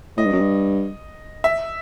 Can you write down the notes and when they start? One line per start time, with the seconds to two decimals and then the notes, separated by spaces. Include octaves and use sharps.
0.17 A2 D#5
0.25 G2
0.33 F#2
0.40 G2
1.44 E5